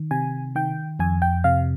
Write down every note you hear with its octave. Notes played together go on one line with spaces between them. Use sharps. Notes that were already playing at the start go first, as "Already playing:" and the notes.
Already playing: D#3
C3 G#5
D#3 G5
F2 G#5
G5
C3 F5